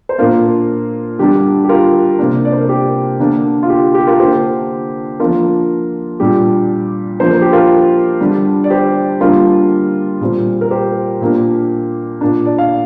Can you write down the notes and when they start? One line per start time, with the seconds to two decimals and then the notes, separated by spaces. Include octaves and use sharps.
0.09 C5
0.19 A#2 A#3 D4 F4 A#4
1.19 D3 G3 D4 G4
1.65 G4
1.69 F4 A#4
2.19 C3 A#3 D4
2.45 D5
2.52 C5
2.61 A#4
2.69 G4
3.20 D3 A#3 D4
3.63 F4
3.70 G4
3.94 G4
4.07 F4 A#4
4.20 D3 A#3 D4 G4 C5
5.20 F3 A#3 D4 F4 A#4
6.20 A#2 G3 D4 G4
7.20 F3 A#3 D4 C5
7.30 A#4
7.42 G4
7.53 F4 A#4
8.21 D3 G3 D4
8.64 D5
8.70 G4 C5
9.20 D3 G3 A#3 D4 F4 A#4
10.21 A#2 G3 C4
10.61 A#4
10.71 G4 C5
11.21 A#2 A#3 D4
12.21 A#2 A#3 D4
12.45 D5
12.58 F5